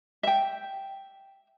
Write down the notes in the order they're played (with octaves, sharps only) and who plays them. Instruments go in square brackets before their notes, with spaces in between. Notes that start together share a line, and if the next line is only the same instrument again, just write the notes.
[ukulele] E5 G5